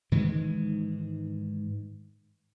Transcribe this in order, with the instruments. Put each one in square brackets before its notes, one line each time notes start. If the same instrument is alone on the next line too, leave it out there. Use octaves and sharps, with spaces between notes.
[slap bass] G#2 D#3 E3 G#3